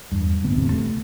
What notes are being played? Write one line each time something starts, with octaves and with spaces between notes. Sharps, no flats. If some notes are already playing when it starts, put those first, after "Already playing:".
E2 G2
D1 D2 B3
D#1 E2 A2 C3
A3